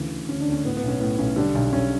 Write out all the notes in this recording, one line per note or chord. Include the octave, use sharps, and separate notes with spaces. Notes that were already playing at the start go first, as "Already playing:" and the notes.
Already playing: D2 C#3 E3
D2
D2 C#4
D3 D4
D2
C#4
A2 B3
B3
B1 C#4
A2 B3
B1 C#4
D3 G3 D4
B1
B1 C#4